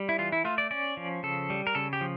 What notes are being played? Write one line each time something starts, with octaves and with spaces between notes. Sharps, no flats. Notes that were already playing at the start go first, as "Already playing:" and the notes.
Already playing: G3
E4
E3 F4
E4
A3 F4
D5
C#4 D5
F3
C#3 A4
G3
A#4
C#3 A4
G4
F3